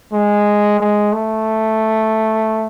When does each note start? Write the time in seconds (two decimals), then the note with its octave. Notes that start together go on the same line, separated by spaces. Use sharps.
0.13 G#3
0.80 G#3
1.13 A3